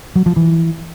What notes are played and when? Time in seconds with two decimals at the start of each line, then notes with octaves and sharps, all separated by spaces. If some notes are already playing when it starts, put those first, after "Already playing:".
0.16 F#3
0.26 F3
0.36 E3